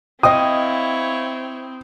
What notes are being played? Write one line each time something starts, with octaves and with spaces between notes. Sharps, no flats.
C4 E4 C#5 D#5 F5 G5 D#6